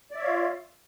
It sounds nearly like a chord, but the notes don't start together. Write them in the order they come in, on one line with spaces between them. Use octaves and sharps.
D5 E5 C#5 F5 F4